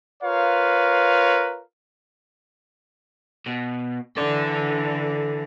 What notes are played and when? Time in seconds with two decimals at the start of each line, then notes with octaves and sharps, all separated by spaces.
0.23 F4 A#4 B4 C#5 F5
3.46 B2
4.17 D3 E3 A4 D5